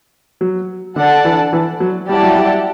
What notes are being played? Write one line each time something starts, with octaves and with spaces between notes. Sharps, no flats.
F#3
D3 D4 A4 D5 F#5 A5
E3
E3
F#3
G3 E4 G4 D5 F#5 A5
F#3
G3